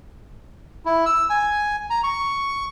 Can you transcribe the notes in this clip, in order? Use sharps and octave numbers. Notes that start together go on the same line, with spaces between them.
E4
E6
G#5
A#5
C#6